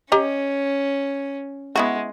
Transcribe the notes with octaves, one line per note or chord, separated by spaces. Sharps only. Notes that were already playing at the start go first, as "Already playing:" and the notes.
C#4 G4 D#5 A#5
G#3 B3 E4 F#4